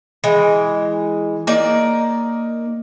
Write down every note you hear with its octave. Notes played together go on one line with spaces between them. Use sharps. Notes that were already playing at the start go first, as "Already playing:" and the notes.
E3 G#3
A#3 D#4 D5